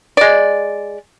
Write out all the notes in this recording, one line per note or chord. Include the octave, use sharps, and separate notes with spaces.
G#3 D5